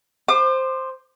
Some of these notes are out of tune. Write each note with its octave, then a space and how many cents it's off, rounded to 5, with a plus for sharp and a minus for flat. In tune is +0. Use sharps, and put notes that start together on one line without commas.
C5 +0 D6 +40